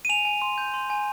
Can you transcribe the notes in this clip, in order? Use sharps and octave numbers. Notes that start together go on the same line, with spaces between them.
D#7
G#5 F7
G#5
C6
G6
C6
G#5